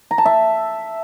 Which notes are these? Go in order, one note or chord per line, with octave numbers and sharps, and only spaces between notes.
A#5
A5
E5